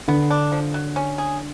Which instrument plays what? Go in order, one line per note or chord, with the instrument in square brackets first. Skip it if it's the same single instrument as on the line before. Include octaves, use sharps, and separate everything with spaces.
[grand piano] D3 [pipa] B3
[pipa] D4
F3
F#3
C#4
G#4